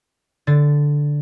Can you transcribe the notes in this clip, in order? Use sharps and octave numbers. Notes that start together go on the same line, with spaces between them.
D3 A6